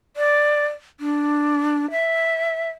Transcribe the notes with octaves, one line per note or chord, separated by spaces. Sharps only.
D5
D4
E5